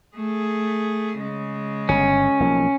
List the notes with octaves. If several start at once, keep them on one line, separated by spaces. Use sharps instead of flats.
A3 G#4
C#3 G#3
G1 C#4
B1 F3 A#3